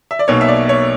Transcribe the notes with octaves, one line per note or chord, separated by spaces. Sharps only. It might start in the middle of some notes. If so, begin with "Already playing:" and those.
E5
D5
B1 B2 A#3 C#5
E5
D5
C#5